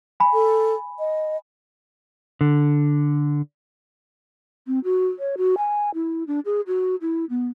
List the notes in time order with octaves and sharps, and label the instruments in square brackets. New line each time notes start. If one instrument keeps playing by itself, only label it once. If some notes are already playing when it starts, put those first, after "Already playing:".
[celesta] G#5 B5
[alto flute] A4
D#5
[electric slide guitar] D3
[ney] C4
F#4
C#5
F#4
G#5
E4
D4
G#4
F#4
E4
B3